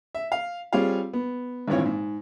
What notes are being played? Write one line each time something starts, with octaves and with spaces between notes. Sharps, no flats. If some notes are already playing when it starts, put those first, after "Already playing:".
E5
F5
G3 C4 F4 G#4 C#5 F5
B3
G#1 G2 A#2 E3 C4 C#5
G#2